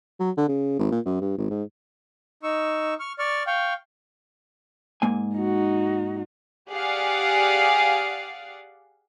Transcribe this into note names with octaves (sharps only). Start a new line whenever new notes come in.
F#3
D3
C#3
G#1
A#2
F#2
G2
G#1
G#2
D#4 C#6 E6
C#6 F6
D5 C#6 F6
F5 G5 C#6
G#2 A#3 G#5
D#4 F#4
G4 G#4 D5 F5 F#5